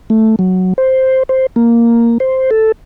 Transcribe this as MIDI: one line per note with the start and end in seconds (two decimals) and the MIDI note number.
0.10 0.35 57
0.39 0.73 54
0.78 1.23 72
1.29 1.46 72
1.56 2.18 58
2.20 2.50 72
2.51 2.72 69